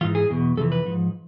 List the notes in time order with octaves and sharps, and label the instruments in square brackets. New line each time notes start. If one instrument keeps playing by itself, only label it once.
[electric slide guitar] E3 F4
G#2
G#4
E2 B2
F2 C3 E3 A4
B4
G#2 F3